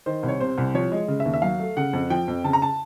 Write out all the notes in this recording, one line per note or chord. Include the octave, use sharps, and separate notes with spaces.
D#3 C5
C2
C#5
C3 C5
C2
F3 C#5
G#3
C#3
E5
D#2
E5
F#3 F5
A3
C#3 F#5
F2
F3 G5
F2
C#3 A5
A#5
A5